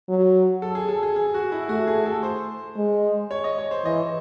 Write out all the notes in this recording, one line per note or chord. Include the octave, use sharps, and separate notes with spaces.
F#3
A4
G#4
A4
G#4
G#4
F#4
E4
A3 F#4
G#4
A4
C5
G#3
C#5
D#5
C#5
C5
E3 D#5